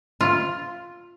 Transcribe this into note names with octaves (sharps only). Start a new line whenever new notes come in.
F4